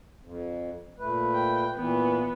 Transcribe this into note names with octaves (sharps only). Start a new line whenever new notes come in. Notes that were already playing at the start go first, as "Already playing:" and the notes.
F2
A#2 A3 B4
G5
A#2 E3 B3